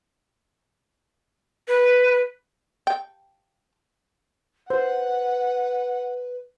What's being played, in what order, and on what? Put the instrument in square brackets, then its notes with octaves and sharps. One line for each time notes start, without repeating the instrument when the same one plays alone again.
[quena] B4
[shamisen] G5
[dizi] B4 [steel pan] C5 [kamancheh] F#5